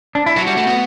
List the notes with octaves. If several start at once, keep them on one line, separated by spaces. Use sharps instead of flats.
D4
E4
F#3 F#4
G3
A3
B3